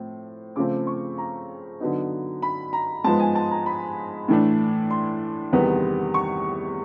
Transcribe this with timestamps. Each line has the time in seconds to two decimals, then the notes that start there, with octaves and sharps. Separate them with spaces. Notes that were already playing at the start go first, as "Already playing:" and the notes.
Already playing: A2 F3 C4
0.56 C#3 F3 A3 C4 D6
0.87 C#6
1.18 A#5
1.80 D3 F#3 B3 D#4
2.42 B5
2.73 A#5
3.04 G#2 F3 G#3 B3 A5
3.20 G#5
3.35 A5
3.51 A#5
3.66 B5
4.28 A2 E3 A3 D4
4.90 C6
5.53 E2 C3 D#3 G3 B3
6.14 C#6